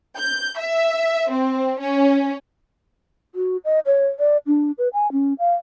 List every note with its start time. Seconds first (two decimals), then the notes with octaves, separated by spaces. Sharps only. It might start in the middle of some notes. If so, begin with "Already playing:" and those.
0.18 G6
0.59 E5
1.31 C4
1.80 C#4
3.35 F#4
3.65 D#5
3.86 C#5
4.19 D5
4.47 D4
4.78 B4
4.93 G#5
5.12 C#4
5.39 F5